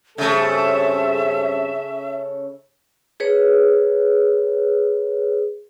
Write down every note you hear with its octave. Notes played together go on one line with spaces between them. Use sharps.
G2 C#3 A3 C4 A4 E5
G#4 B4 C#5